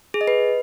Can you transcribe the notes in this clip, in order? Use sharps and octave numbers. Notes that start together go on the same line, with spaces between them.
G#4
D#5
B4